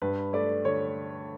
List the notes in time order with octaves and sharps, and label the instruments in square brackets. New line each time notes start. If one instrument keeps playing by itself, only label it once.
[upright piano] G2 [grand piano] B4
[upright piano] A3 [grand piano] D5
[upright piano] D3 [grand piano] C#5